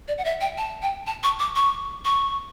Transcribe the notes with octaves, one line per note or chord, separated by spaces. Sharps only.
D5
F#5
E5
G5
A5
G5
A5
C#6
D6
C#6
C#6